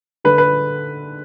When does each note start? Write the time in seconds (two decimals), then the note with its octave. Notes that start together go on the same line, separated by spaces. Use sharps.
0.24 D3 A3 B4
0.38 B4